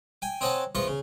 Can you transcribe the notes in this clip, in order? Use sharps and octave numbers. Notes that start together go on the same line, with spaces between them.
G5 G#5
C4 C#5 D#5 F#5 G#5 A5
E2 F3 F4 D#5 C#6
C#3